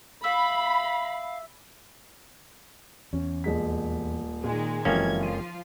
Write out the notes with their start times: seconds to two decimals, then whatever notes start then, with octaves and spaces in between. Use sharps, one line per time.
0.24 E5 F5 B5
3.13 E2 C#4
3.44 D#1 G#3 B6
4.44 A#2 D#3 G#3
4.85 F#1 F2 E3 F#3 G#3 A#3 C#4 G#6
5.23 F3 F4 D#7